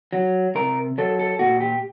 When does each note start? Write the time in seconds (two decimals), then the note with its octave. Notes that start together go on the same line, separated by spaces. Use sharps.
0.13 F#3
0.55 C3 A#4
0.98 F#3 A4
1.19 A4
1.39 A#2 F#4
1.60 G4